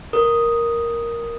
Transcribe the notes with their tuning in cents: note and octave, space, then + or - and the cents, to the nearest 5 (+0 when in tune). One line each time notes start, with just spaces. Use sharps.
A#4 +0 D#6 +0